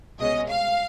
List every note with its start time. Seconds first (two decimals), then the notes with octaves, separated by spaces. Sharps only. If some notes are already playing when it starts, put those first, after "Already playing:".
0.19 C2 B2 G#3 C#4 D#5
0.49 F5